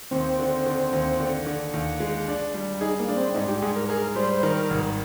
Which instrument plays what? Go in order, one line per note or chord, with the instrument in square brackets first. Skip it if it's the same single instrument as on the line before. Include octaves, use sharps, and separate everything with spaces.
[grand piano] D#2 [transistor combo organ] C4
[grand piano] D3
D3
D#2
D3
D3
D#2
G#3
D4
G3
[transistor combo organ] D#4 [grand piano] G#4
[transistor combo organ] A#3
[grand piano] D4
[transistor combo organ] C4
[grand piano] G#2 [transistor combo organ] D#4
[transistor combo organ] G4
[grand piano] G#2 [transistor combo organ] G#4
[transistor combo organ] A#4
[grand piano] G#4 [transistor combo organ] A#4
[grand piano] G3 [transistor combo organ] C5
[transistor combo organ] C5
[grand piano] D#3 [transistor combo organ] A#4
[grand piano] G#1